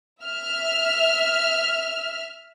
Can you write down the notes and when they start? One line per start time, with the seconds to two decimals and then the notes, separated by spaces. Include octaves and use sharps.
0.23 E5 F6